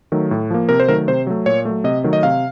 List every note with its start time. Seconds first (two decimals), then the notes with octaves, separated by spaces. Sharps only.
0.12 D#3 F#3 A3
0.31 A2
0.50 F3 A#3
0.69 C3 A#4
0.80 C5
0.88 D#3 F#3 A3 A#4
1.08 C3 C5
1.27 F#3 A3
1.46 A#2 C#5
1.65 F#3 A3
1.84 C3 D#5
2.04 D#3 F#3 A3
2.13 D#5
2.23 C3 F5